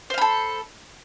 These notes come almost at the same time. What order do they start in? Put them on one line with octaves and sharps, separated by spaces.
C5 F5 B5 A4